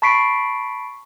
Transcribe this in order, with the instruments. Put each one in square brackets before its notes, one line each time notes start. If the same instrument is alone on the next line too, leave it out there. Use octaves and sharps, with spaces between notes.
[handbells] A5 B5 C#6 B6 C7 D7